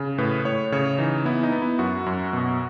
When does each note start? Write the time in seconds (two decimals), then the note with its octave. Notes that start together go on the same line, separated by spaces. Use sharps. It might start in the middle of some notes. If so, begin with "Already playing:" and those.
Already playing: C#3
0.18 A2 B4
0.45 A2 C#5
0.72 C#3 C#5
0.98 E3 D#4
1.25 B3 E4
1.43 D#4
1.52 B3
1.62 E4
1.79 F#2 F#4
2.06 F#2
2.33 B2